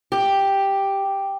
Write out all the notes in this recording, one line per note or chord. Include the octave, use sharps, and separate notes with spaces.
G4